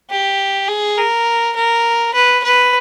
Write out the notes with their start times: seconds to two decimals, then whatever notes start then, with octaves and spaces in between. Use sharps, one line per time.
0.10 G4
0.68 G#4
0.97 A#4
1.56 A#4
2.14 B4
2.44 B4